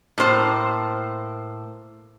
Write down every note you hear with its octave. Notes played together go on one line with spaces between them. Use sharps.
A2 A#3 C5 A5